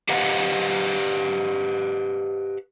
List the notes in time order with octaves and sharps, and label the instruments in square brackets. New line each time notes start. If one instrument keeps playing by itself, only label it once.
[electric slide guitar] G4 B4 C5 D#5 F5 F#5